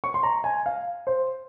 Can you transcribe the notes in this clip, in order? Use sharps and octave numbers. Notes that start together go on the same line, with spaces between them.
C#6
C6
A#5
G#5
F5
C5